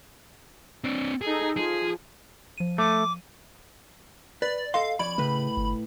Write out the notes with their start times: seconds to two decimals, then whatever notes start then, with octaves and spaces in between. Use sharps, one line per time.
0.84 C4 D4
1.21 D#4 G#4 A4
1.57 F3 G#4
2.58 F3 D#7
2.78 A3 D6
4.42 B4 D5
4.74 A4 D#5 F5 C6
4.99 F2 C#5 D5 B5
5.18 A2 C#3 B4
5.57 G1